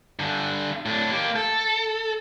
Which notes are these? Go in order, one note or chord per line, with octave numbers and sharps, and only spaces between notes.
G2 D3
A2 D4
A#3 G4
A4